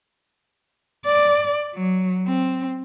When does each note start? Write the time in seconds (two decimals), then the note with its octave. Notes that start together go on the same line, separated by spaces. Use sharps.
1.05 D5
1.74 F#3
2.26 C4